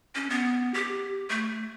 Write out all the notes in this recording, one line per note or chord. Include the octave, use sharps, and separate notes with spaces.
C#4
B3
G4
A3